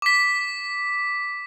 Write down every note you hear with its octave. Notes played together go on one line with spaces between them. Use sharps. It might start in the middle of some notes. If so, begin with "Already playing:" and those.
D6 B6